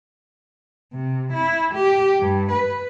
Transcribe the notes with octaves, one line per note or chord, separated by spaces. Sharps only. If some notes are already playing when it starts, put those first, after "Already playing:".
C3
E4
G4
G2
B4